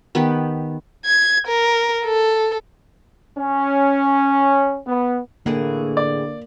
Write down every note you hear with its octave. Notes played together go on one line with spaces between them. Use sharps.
D#3 B3 G4 B4
G#6
A#4
A4
C#4
B3
A2 D3 E3 A#3 G#4
D5